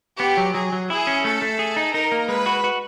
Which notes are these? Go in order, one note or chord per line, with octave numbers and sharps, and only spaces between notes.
B3 G4
F#3
F#3 G#4
F#3
E4 G#4
C#4
A3 A4
A3
G#4
D#4
D#4 A#4
A#3
G#3 B4
F#4
F#4